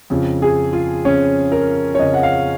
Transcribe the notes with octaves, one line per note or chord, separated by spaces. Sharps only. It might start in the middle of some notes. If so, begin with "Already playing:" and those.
F2 C#3
G#4
F4
F2 C#3 C#4
A#4
C#5
F2 C#3 D#5
F#5
F5